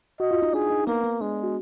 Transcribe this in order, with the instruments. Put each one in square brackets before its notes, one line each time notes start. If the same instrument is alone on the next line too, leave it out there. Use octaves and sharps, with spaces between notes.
[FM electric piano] F#4 [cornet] D#5
[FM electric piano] F4
D#4
[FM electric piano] D4 [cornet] G#4
[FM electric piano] D#4
[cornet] A#3 [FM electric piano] B3
[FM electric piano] B3
[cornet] G#3 [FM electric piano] D4
[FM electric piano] F#4